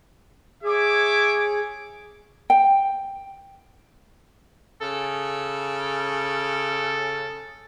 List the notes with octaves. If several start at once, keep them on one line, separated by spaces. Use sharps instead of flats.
G#4 C#5 E5 D6
G5
C#3 A4